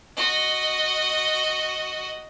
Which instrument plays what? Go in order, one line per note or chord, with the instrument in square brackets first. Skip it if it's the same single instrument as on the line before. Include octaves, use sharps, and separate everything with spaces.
[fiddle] F#4 D#5